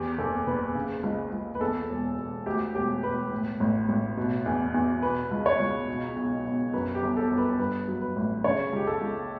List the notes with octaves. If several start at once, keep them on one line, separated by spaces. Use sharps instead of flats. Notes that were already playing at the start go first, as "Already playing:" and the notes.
Already playing: E2 G4
F#1 A4
F#1 B4
C#3
C#2
C#2
B4
E2 A4
E1
E1
D2 G4
E1 G4
E1 B4
A2
A1
A1
B2
E2
E2
B2 B4
C#2
C#5
C#2
B2
B1
B1
F#2 B4
G4
G1
A4
G1
B4
G2 B4
F#3
B4
A1
C#3 C#5
C#2 G4
A4
C#2